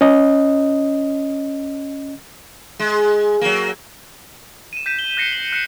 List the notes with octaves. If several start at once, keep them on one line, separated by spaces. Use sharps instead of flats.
C#4 D#5
G#3
F#3 A#3
D#7 E7
G6 B6 D#7 E7
G7
F#6 G6 A#6 C7 C#7 G7
F#7
F#6 C7 C#7 E7